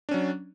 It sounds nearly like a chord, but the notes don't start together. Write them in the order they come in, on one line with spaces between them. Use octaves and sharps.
D4 C#4 F#3